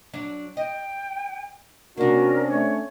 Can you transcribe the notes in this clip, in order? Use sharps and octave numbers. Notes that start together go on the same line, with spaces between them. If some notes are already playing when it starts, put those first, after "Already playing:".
F#3 D4
D#5 G5
C3 A#3 C#4 D4 F#4 A#4
A3 C#5